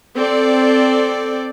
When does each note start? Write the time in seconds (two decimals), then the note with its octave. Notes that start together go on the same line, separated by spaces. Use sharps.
0.16 C4 A4 D5